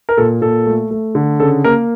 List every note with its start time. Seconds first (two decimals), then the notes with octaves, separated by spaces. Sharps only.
0.09 A#4
0.17 A#2 A4
0.41 A#2 A4
0.67 A3
0.91 A3
1.15 D3
1.40 C#3 A4
1.64 A#3 A#4